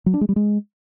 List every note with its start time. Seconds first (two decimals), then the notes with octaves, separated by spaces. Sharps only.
0.06 F#3
0.14 D4
0.21 G#3
0.29 G3
0.36 G#3